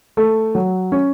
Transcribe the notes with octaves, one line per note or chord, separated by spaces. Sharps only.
A3
F#3
C#4